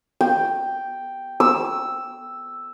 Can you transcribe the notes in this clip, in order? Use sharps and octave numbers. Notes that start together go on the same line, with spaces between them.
G5
E6